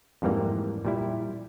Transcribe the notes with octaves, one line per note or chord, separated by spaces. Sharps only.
F2 G#2 E3 G3 A#3
A#2 G3 E4